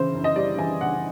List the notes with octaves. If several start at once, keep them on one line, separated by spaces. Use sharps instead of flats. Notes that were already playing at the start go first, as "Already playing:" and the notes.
Already playing: C#3 E3 C5
F#2
D#5
G3 D5
E3 G#5
C#3 F#5